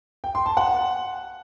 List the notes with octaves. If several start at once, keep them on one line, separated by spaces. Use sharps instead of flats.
G5
C6
A5
F#5